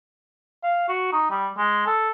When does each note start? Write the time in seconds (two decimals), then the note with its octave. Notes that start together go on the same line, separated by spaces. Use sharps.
0.63 F5
0.88 F#4
1.12 D#4
1.31 G3
1.58 G#3
1.86 A4